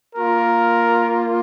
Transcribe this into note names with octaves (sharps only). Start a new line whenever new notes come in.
A#3 F4 A#4